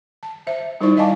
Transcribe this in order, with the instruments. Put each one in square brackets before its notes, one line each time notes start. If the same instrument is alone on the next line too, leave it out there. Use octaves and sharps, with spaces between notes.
[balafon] A5
C5 E5
G3 D#4 E4 C5 D5 C#6
D5 D#5 F5 G#5 A5 D6